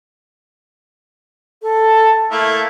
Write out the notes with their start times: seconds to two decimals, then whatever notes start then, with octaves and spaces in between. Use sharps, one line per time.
1.62 A4
2.31 A3 A#3 E4 A4